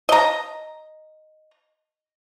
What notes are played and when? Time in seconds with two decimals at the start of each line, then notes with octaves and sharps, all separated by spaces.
0.09 D#5 A#5